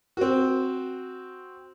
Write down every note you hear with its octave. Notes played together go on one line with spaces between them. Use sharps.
C4 F#4